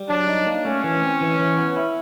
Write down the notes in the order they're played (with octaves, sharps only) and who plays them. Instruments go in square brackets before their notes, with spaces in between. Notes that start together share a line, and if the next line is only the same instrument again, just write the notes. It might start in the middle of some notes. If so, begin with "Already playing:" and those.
Already playing: [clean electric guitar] G3
[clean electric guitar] F#3 [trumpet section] D4
[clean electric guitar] D#4
A#3
[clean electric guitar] A3 [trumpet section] C#4
[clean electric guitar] E3
C4
E3
E3
B3
E4